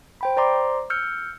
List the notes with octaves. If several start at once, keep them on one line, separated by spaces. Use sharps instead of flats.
C5 G5 B5
C5 D5 A#5 C6 D6
E6 F6 G6 C#7